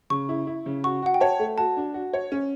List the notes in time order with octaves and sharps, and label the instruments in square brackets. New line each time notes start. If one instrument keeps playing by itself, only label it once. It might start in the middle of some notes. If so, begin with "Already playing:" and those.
[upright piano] C#3 [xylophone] C#6
[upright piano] E4
E4
C#3
[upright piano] F#4 [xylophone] C#6
[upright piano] F#4 [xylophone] F#5
[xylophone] G5
[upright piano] C#5 [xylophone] A5
[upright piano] A3
[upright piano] F#4 [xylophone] A5
[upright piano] D4
F#4
C#5
C#4